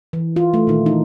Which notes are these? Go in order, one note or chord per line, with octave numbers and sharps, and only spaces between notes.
E3
F4
A3
A#2 D#3
E3 D#4 E4